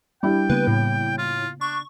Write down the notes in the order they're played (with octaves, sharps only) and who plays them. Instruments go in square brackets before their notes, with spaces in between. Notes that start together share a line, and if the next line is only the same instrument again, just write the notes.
[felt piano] G3 D4 E4 [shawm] G5
[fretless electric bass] C#3 A#3 B3 [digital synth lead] B4
[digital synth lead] A2
[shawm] F4
[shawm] D4 [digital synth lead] C#6